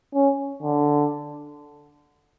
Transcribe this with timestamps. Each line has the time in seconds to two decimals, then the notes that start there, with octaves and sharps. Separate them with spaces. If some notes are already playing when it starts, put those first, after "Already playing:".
0.14 C#4
0.63 D3